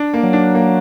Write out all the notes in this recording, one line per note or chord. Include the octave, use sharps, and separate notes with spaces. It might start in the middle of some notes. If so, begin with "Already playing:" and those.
Already playing: D4
A#3
F#3
D4
A#3